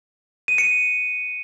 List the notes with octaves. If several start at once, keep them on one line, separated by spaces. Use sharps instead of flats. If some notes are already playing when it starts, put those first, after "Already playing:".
D#7
C#7